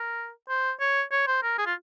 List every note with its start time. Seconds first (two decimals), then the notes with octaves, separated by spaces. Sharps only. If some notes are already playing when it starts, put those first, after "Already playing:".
Already playing: A#4
0.49 C5
0.80 C#5
1.11 C#5
1.27 C5
1.43 A#4
1.58 G#4
1.66 F4